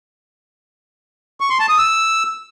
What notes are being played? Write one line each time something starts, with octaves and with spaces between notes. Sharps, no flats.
C#6
C6
A5
D#6
E6